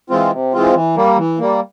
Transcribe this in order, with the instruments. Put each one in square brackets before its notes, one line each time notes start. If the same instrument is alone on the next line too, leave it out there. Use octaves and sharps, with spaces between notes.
[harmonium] E3 G#3 C4 F4
C3
E3 G#3 C4 F4
E3
G3 A#3
E3
G3 A#3